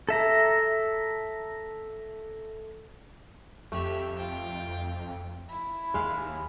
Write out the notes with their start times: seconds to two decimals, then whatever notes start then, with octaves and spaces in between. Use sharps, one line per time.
0.09 A4 E5 A#5
3.72 F2 A3 G4 E5
4.17 F4 G5
5.49 E4 B5
5.94 D#2 G#3 F5